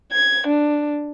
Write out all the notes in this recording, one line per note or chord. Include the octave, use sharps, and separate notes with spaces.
G#6
D4